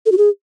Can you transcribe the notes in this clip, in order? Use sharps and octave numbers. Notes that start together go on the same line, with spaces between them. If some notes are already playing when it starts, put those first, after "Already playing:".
A4
F#4
G#4